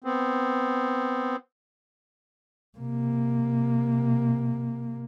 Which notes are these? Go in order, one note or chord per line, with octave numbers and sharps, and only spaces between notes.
B3 C4
C3 A#3